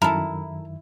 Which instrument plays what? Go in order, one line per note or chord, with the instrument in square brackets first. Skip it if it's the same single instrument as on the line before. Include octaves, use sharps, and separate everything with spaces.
[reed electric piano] F#2 D#3 [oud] E4 [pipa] A4 A#4